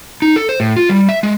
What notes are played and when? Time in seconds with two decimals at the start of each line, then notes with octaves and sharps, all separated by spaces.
0.22 D#4
0.36 A4
0.49 C5
0.60 A2
0.76 F4
0.89 G3
1.09 E5
1.23 G#3